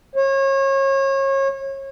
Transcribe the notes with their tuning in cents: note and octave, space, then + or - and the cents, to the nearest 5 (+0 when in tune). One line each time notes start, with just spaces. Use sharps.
C#5 -30